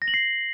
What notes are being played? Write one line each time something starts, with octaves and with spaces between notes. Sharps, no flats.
A#6
F#7
C7